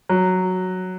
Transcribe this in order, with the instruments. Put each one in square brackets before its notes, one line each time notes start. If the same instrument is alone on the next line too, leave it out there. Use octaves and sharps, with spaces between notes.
[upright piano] F#3